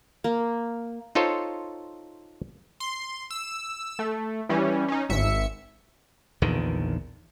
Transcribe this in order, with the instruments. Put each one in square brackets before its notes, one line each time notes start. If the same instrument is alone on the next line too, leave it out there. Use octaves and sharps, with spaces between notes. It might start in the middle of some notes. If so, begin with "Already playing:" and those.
[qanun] A#3
[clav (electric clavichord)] D#4 F4 A4 C5 C#5
[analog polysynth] C6
E6
A3
E3 G3 C#4
C#4 D#4
G#1 E5 C#7
[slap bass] A#1 E2 D3 D#3